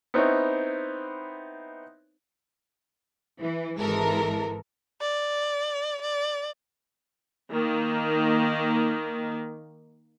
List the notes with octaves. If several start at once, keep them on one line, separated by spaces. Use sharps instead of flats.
B3 C4 D#4 E4 C#5
E3
G#1 E3 G#3 A4 A#4
D5
D5
D#3 A#3